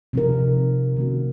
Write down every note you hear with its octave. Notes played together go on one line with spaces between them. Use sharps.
C3 F3 C4 D#4 A#4
D#3 A#3 C#4 F#4